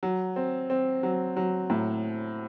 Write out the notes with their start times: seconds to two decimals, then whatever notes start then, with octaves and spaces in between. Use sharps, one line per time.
0.03 F#3
0.36 C4
0.70 C4
1.03 F#3
1.37 F#3
1.70 A2